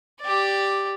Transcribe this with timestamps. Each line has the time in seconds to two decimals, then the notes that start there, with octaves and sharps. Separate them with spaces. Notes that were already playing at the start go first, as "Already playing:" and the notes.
0.21 G4 D5